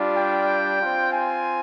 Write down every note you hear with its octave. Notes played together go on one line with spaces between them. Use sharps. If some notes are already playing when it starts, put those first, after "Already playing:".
Already playing: G3 D4 F4
G5
C4 F4
G#5